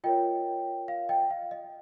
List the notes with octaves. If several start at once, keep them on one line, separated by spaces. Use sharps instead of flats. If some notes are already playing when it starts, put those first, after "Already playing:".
F4 A#4 C#5 D#5 G5
F5
D#5 G5
F5
D#5